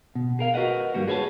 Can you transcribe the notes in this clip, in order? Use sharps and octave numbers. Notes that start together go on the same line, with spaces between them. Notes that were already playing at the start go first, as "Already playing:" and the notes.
B2
G#4 A#4 F5
F#4 A#4 B4 D#5 F#5
G2 G3 A#3 F#4
G#4 B4 C#5 D#5 A5